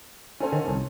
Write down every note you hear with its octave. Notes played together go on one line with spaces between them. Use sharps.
C#4 A4 C5
D3 D#3
C2